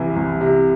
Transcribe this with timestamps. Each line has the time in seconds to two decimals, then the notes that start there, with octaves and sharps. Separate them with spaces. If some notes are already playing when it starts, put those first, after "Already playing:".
Already playing: C2 C3 E3
0.16 C2
0.41 C3